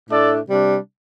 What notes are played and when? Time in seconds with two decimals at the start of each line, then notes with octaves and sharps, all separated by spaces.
0.09 A2 A3 D4 A4 D5
0.47 C3 G3 D4